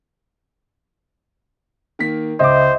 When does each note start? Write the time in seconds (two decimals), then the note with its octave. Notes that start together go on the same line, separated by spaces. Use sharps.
1.99 D#3 A#3 B6
2.40 C#2 C5 D#5 E5 D6